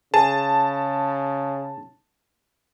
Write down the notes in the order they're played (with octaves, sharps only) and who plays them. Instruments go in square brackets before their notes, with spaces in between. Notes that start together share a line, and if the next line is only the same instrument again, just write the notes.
[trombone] C#3 [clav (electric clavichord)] G#4 [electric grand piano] A5